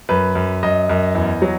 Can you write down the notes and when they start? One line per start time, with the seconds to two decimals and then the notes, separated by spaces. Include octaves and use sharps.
0.09 F#2 B4
0.35 F#2
0.63 F#2 D#5
0.89 F#2
1.15 E2
1.42 F#3